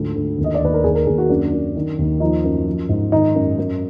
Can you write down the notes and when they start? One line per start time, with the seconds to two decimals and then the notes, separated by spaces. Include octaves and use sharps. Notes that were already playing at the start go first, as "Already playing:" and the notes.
Already playing: D2 G#2 F3
0.15 D2
0.38 D#2
0.44 D#5
0.54 D5
0.61 D#2 B4
0.74 A#4
0.84 D#2 G#4
0.95 A#4
1.07 D#2 G#4
1.18 F#4
1.29 F#2 D4
1.53 F#2
1.75 D#3
1.98 D#2
2.20 F3 D#4
2.44 F#2
2.66 F3
2.89 G#2
3.12 D#3 D#4
3.35 F#2
3.58 F#2